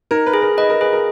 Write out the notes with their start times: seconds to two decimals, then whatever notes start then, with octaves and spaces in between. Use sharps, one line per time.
0.11 D#4 A#4
0.26 B4
0.34 G#4
0.42 A#4
0.57 B4 D#5
0.70 A#4
0.81 G#4 B4
0.93 A#4